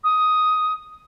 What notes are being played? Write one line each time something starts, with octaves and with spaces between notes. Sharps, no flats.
D#6